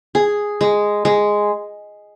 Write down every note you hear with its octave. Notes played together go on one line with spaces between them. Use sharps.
G#4
G#3
G#3